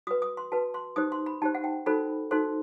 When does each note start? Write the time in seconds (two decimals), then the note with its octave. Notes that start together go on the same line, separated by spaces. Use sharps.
0.07 F#4 B4 D#6
0.22 D#6
0.37 C6
0.52 F#4 B4 A5
0.74 C6
0.96 D#4 G4 C5 D#6
1.12 C6
1.26 B5
1.42 D#4 G4 C5 A5
1.55 F#5
1.64 G5
1.86 D#4 F#4 A4 C5 B5
2.31 D#4 F#4 A4 C5 C6